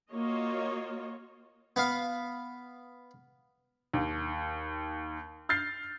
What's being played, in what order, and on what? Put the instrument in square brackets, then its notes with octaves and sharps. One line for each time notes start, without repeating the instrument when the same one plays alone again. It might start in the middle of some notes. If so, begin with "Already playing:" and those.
[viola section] A#3 F4 F#4 C#5 D#5
[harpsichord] B3 F5
[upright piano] D#2
F6 G6 A6 C7